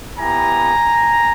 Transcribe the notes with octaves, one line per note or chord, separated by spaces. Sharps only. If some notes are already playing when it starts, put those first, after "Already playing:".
B3 E4 G4 G#5 A#5